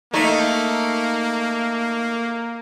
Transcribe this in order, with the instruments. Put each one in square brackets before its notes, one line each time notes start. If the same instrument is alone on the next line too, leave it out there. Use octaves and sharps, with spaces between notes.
[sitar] A3 D#4 [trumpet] A#3